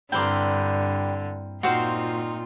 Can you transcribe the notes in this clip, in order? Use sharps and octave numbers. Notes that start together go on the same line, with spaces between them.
G2 D3 A#3 C4 E4 G4 B4 G5
A#2 C4 D#4 F4 F#4 C5 F5